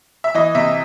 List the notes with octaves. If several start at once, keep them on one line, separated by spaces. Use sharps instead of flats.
E5
E3 D#5
C3 E5